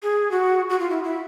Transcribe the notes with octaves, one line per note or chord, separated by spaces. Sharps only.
G#4
F#4
F#4
F4
E4
E4